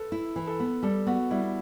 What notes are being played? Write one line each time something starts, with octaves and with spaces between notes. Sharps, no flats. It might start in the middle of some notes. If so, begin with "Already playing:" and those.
Already playing: A4 B4
E4
E3
A4
B3
G3 A4
B3 F#4
G3 E4